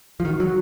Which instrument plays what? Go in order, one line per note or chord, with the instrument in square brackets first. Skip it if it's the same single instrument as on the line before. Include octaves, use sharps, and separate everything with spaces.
[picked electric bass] F3
[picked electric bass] D#3 [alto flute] F#4
[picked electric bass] F#3 [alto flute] F#4